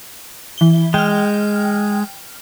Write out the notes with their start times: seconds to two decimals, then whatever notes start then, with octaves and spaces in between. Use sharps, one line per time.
0.58 E3 G7
0.94 G#3 G5 F6